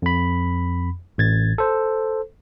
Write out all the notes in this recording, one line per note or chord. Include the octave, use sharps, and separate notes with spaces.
F2 B5
A1 G#6 A6
A4 C5